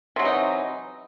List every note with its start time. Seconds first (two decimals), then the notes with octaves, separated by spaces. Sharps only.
0.16 C3
0.19 F#3
0.22 E3
0.25 D#4